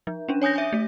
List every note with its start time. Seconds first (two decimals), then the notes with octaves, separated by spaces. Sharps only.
0.07 F3
0.28 C#4 D4
0.42 C#5 G#5 D#6 G6 A#6
0.53 E5 G#5 G6
0.73 A3